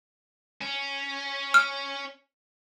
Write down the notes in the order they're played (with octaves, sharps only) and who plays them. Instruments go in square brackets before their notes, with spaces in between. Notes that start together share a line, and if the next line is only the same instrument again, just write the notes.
[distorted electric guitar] C#4
[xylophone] F6